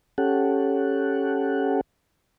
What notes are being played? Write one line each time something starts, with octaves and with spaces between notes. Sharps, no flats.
C#4 G4 A4 F#5